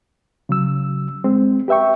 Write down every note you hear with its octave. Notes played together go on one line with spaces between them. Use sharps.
C#3 F#3 E6
G#3 C4
G4 B4 E5 G5 C#6